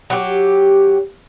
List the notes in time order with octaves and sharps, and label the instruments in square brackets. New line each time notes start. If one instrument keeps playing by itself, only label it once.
[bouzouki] F#3 G4